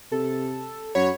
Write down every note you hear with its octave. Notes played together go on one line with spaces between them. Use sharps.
C3 A4
F#2 F#3 C#5 B5